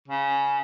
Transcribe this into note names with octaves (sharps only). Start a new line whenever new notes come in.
C#3